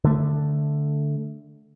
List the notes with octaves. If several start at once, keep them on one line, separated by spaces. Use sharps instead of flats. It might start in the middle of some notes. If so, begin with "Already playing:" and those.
D3 A3